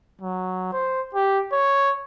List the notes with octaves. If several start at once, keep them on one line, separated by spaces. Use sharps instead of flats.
F#3
C5
G4
C#5